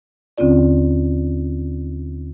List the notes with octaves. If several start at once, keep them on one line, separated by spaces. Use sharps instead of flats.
D#2 D3 C4 C#4 F4 D5